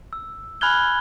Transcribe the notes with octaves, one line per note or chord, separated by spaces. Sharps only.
E6
G#5 B5 F6 F#6 G#6 G7